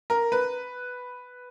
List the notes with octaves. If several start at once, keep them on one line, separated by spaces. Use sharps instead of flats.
A#4
B4